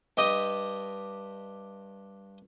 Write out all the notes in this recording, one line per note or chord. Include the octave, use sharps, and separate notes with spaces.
G2 G4 D#5 D#6